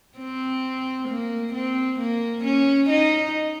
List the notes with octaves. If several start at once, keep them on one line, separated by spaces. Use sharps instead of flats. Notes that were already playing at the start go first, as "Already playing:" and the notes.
C4
A#3
C4
A#3
C#4
D#4